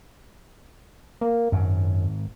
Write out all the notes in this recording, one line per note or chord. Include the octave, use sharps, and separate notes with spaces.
A#3
G#1 F#2